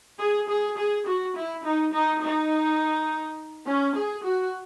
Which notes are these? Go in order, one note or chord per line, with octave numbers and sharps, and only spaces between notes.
G#4
G#4
G#4
F#4
E4
D#4
D#4
D#4
C#4
G#4
F#4